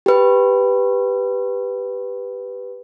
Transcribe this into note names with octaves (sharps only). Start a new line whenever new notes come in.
G4 B4